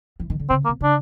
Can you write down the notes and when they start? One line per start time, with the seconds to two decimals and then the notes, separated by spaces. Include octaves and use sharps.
0.20 E3
0.30 D#3
0.40 D3
0.50 C#3 C4
0.65 A#3
0.69 C3
0.81 C#3 D4